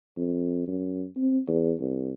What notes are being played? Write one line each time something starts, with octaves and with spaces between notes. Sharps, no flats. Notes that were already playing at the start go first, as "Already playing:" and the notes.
F2
F#2
C4
E2
C2